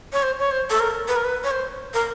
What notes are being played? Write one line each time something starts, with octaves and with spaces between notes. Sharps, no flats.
C#5
C5
C#5
C5
A4
A#4
B4
A#4
B4
C#5
C5
A#4